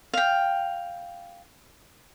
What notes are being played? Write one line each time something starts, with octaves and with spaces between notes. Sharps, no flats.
F5 G5